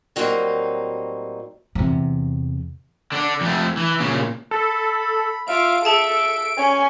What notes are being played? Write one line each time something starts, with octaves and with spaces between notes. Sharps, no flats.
A2 F#3 G3 A#3 C4 D#4
E2 C3
D3 D4
F2 A3
E3
A#2 C#3
A4 B5
F4 E5 F5 D7
G#4 A4 E5 A5
C#4 G#5